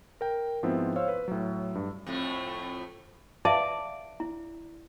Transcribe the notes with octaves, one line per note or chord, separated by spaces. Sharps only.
A#4 G5
G#2 F3 B3 C4 E4
C5 C#5 F5 E6
B4
A2 F#3
G2
F2 A2 A3
D5 E5 F5 A5
E4